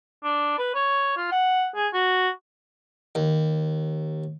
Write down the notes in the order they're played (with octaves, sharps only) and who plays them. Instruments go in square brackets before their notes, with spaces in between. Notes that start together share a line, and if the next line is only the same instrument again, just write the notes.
[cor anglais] D4
B4
C#5
F4
F#5
G#4
F#4
[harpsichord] D#2